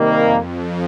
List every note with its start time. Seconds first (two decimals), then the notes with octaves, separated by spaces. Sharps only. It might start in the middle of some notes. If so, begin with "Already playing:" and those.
Already playing: C3 D#3 G3 A#3
0.18 F2